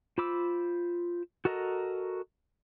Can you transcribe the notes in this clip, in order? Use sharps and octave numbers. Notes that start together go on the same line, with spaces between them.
F4 C5 B5 D6 E6
F#4 A4 A#4 D#5 A#5